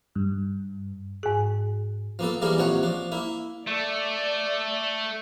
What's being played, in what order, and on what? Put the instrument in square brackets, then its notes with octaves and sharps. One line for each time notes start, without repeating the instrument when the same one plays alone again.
[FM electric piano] G2
[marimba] G#2 G#4
[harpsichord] F3 A#3 B3 A4
E3 G3 A3 A#3 G#4 A#4
A#1 C3 F3 C#5 F#5
F3 D4
A#3 E4
[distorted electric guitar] A3 [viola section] D5